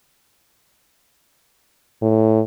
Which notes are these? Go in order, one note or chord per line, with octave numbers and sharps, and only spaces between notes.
A2